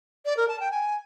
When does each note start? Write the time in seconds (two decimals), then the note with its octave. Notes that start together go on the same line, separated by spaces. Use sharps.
0.25 D5
0.36 A#4
0.48 A5
0.59 G5
0.71 G#5